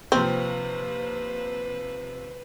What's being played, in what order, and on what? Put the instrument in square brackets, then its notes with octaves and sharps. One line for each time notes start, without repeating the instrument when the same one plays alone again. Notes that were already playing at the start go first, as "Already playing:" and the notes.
[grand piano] D#2 C3 F3 [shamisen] C4 [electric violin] B4 C5